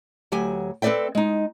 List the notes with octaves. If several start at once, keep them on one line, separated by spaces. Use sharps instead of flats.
D2 F#3 G4 G#5
C4 A4 B4 D5 E5 G5
G#3 D#4